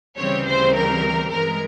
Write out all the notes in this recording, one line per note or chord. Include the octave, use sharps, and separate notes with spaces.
D2 C#3 E3 G3 C4 C#5
C5
A#4
G2 E3 G#3 A#4